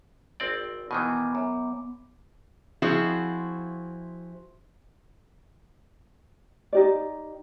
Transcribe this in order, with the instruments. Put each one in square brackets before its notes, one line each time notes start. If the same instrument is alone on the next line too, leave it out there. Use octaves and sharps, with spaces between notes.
[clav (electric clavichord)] G#1 C4 D5
[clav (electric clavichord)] B2 D#3 E3 [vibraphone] B3 D6
[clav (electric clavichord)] F#2
[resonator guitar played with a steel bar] F3 C4 E4 F#4 G#4
[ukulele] D#4 G4 D5